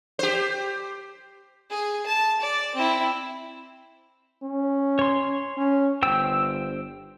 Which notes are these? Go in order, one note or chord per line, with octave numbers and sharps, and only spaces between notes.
G4 C5
G#4
A5
D5
C4 E4
C#4
C#5 C6
C#4
G1 C5 G5 E6